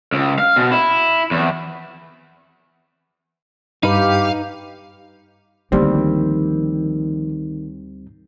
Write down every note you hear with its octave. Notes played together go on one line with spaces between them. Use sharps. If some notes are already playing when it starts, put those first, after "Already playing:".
C#2
F5
B2
E4
E2
G2 D#4 G4 B4 F5
D2 D#3 F3 G3 A#3 C4